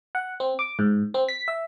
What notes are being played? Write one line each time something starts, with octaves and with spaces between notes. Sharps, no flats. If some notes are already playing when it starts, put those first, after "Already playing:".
F#5
C4
D6
G#2
C4
B6
E5